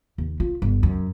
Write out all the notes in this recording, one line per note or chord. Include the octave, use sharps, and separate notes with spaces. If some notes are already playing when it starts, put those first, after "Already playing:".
D#2
F4
G1
F#2